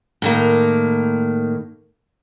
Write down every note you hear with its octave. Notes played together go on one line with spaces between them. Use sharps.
A2 D#3 A#3